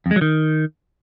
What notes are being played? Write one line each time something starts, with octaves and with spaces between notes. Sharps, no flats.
F2
G#3
F#3
D#3